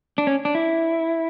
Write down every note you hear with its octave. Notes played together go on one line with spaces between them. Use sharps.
D4
C#4
D4
E4